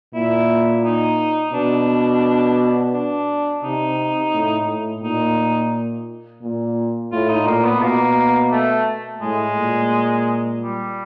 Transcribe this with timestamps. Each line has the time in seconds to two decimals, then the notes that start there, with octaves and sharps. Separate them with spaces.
0.14 A#2 E4
0.84 D#4
1.53 B2 D4
2.93 D4
3.63 C3 D#4
4.33 A2
4.68 A2
5.03 A#2 D#4
6.42 A#2
7.12 A2 F4
7.29 D#4
7.47 A#2 A#3
7.65 B3
7.82 B2 A#3
8.52 A3
9.21 A2 G#3
9.56 A#2
10.61 G3